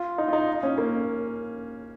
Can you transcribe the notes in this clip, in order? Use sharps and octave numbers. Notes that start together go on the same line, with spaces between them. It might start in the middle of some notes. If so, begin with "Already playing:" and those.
Already playing: F4
D#4
F4
D#4
C#4
A#3